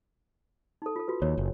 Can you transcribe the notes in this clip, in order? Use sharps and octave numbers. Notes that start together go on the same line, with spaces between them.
D#4 A4
F4 A4
F4 F#4 B4
D#2 C#5
F#1